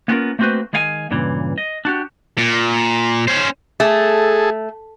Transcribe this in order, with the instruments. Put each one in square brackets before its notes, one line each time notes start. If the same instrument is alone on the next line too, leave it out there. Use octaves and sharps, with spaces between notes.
[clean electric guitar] A#3 B3 C#4 F4 G#4 A#4
A3 A#3 C4 F#4 B4 C5
D#3 G#3 G#4 F5 G5 G#5
G2 A#2 C#3 E3
D#5
D4 F#4 G4
[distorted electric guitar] A#2
C#4 C5
[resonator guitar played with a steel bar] A3 [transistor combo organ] G#4 A4